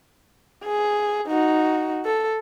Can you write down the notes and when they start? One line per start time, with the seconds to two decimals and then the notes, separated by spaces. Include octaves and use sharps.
0.64 G#4
1.28 D#4 F#4
2.05 A4